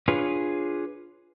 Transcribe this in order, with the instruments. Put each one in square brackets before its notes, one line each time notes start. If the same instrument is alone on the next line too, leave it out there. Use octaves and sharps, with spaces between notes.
[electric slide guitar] D4 F4 G#4 B4 C#5